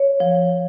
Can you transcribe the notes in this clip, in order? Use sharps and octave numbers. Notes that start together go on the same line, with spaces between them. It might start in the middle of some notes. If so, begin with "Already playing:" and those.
Already playing: C#5
F3